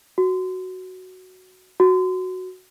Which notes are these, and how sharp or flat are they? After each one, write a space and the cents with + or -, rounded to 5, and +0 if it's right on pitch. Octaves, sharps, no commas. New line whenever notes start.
F#4 +5
F#4 +0